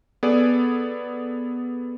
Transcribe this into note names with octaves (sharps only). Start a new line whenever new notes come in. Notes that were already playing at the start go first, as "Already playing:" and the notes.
B3 G#4 A4 D5